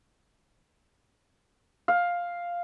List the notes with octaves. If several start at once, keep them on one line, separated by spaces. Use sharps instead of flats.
F5